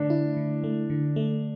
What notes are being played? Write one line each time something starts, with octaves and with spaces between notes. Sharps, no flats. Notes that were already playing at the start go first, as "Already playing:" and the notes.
Already playing: D3 A3 D4
E4
D3
A3
D3
A3